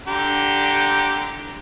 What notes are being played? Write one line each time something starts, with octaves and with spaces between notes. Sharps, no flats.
D3 G4 A#5